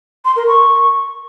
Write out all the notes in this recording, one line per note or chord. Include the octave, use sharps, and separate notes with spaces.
C6
A#4
C#6